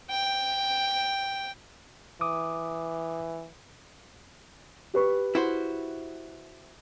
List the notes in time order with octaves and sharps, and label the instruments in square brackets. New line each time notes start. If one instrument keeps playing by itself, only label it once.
[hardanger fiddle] G5
[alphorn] E3 [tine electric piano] D6 D#6
[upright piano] G4 B4 C#6
[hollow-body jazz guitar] E4 F#4 C5